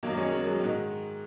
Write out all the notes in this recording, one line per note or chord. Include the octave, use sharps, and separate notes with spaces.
F#2 D#3 F#3 A#3
G#3 C#4
G#3
F#3
G#2 D#3 G#3